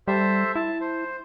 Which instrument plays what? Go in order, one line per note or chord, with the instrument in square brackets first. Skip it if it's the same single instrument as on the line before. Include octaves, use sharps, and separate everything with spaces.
[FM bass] G3 [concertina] A4 C5 E5
[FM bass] E4 [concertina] A5
[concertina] C5